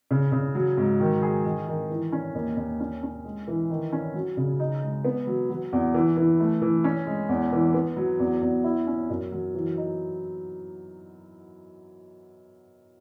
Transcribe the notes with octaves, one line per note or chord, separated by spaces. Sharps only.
C#3
C#3
F#3
G#2
D#3
G#4
D#3
D#3
E3
C#4
D#2
D#2
C#4
C#4
G#3
E3
D#3
C#4
F#3
C#3
D#4
G#3
B3
F#3
F#3
E2
E3
E3
A3
E3
C#4
G#3
E2
E3
B3
F#3
E2
E2
E4
C#4
F#2
F#3
E3
D#4